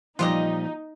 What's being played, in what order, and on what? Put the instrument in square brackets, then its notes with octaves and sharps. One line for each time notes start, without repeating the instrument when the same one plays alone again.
[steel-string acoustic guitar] A#2 F3 G3 [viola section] D#4 [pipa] F4 G4 D#5